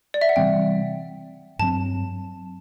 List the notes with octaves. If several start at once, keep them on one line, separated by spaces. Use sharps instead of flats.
D5
E5
F#5
C3 E3 G3 C4 G5
G2 F#3 C4 A5